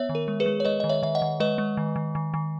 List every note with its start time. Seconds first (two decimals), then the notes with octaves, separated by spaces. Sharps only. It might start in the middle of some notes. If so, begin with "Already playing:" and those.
Already playing: B3 C#5 E5
0.09 D#3
0.15 A#4
0.28 G#3
0.40 G#4 B4
0.46 G#3
0.60 C#5
0.65 G#3 B4 D#5
0.80 D#3 D#5
0.89 C#5 E5
1.03 D#3 E5
1.15 D#5 F#5
1.22 D#3
1.40 G#3 B4 D#5
1.58 G#3
1.77 D#3
1.96 D#3
2.15 D#3
2.34 D#3